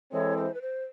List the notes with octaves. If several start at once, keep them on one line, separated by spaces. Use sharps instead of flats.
E3 G#3 C4 E4 A4 C#5
C5
B4
C5